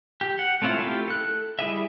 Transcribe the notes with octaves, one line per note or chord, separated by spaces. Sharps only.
G4
F#5
A3 C4 C#4 E4 F4
A3 E4 F4 G4
A4 F#6
G3 E4 G#4 E5